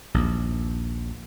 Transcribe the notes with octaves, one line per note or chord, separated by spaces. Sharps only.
A#1 D#2